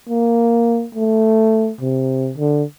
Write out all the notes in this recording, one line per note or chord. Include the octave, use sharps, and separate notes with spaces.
A#3
A3
C3
D3